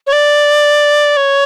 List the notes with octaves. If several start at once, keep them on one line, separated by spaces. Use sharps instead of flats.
C#5
D5
C#5